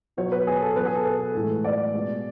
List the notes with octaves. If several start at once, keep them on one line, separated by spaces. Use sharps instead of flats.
B2 F#3 C#5
B4
G#4
A4
B2 F#3 B4
G#4
A4
B4
A4
A2 E3 G#3 A4
D5
B2 G#3